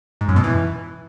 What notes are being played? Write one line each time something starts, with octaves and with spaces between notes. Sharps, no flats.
G#2
F#2
B2
E3